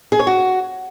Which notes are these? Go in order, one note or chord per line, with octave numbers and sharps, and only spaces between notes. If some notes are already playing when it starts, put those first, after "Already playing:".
G#4
C#5
F#4